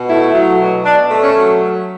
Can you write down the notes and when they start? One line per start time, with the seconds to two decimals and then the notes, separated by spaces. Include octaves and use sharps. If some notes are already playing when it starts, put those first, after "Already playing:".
Already playing: B2
0.09 A3 E4
0.34 F#3
0.60 B2
0.84 B2 D4
1.10 A3
1.22 C#4
1.35 F#3